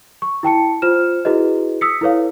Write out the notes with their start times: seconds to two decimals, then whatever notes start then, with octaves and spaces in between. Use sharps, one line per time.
0.22 C#6
0.43 E4 G5 A5 C#7
0.82 F4 C5 F6 E7
1.25 E4 F#4 G#4 B4 D#5
1.81 D#6 E6 B6 C#7
2.01 E4 A4 B4 C#5 F5